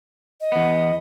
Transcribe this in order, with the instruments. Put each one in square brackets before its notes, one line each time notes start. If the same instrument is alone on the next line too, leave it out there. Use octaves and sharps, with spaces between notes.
[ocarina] D#5
[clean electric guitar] E2 B3